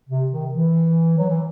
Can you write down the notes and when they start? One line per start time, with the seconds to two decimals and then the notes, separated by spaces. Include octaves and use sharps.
0.10 C3
0.32 D#3
0.53 E3
1.18 F#3
1.29 E3